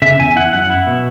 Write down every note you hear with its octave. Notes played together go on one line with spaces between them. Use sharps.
C#3 E5
E2 G#5
E4 F#5
F#2 F#5
E4
B2